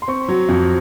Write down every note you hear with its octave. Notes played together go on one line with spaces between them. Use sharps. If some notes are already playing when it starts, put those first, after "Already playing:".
C6
C4 C#6
F#3
F2